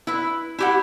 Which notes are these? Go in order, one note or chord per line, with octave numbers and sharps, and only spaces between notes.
E4 B4
E4 G4 F#5